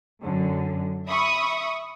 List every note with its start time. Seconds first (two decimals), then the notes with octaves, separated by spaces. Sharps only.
0.23 F#2 D3
1.08 E5 B5 C#6 D#6